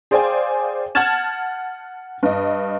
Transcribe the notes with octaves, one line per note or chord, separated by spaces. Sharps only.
G#4 C5 D5 F5 G5 G#5
F#5 A5 F6 G#6 A6 E7
G2 D#5